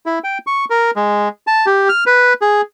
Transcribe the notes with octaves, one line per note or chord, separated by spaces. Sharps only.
E4
G5
C#6
A#4
G#3
A5
G4
F6
B4
G#4